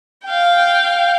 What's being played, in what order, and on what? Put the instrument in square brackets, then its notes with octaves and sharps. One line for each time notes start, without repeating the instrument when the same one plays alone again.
[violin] F5 G5